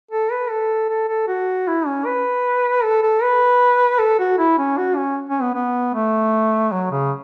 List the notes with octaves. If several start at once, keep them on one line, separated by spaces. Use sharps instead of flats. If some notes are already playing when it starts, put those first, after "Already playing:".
A4
B4
A4
A4
A4
F#4
E4
C#4
B4
A4
A4
B4
A4
F#4
E4
C#4
F#4
C#4
C#4
B3
B3
A3
F#3
C#3